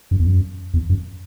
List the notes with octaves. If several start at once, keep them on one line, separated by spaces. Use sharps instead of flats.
F#2
E2
F#2
E2
F#2